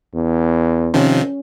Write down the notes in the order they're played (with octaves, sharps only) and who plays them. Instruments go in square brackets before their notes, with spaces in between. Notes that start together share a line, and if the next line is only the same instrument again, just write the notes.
[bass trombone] E2
[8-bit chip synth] C3 D#3 F3 [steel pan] C#4